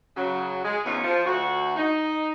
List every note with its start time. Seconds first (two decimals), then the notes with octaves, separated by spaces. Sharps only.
0.17 C#3 F#3
0.64 G#3
0.86 E2 A2 C3 C#4 D#4 F4
1.04 F3
1.26 D2 F#4
1.77 D#4